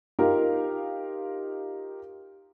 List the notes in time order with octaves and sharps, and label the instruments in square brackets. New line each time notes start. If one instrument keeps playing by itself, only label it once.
[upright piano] D#4 F4 G4 A#4 F5